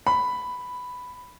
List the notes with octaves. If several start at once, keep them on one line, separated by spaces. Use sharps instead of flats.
B5